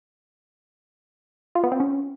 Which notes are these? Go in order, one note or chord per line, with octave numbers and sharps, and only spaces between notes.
F4
B3
C4
C#4